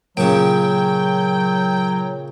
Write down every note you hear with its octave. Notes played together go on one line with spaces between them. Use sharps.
A#2 C#3 F#3 G5